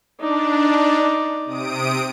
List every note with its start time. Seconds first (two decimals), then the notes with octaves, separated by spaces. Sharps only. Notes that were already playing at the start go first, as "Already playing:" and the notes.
0.20 D4 D#4 D5
1.45 C3 D#6 D7